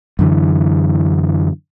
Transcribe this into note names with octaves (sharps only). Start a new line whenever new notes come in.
F#2 D3 E3